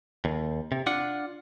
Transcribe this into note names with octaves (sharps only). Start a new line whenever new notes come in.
D#2
C3
D4 F4 F#5